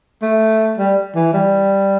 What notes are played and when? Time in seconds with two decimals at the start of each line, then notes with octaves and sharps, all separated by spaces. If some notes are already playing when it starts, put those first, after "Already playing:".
0.22 A3
0.77 G3
1.15 E3
1.33 G3